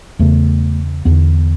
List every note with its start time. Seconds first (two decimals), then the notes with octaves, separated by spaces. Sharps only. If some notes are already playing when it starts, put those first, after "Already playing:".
0.19 E2 C#3 A3
1.05 E2 D3 B3